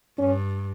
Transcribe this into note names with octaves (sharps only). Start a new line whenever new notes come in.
G2 C#4